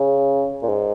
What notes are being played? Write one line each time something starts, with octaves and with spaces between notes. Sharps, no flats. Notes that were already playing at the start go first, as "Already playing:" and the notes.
Already playing: C#3
A#2
G#2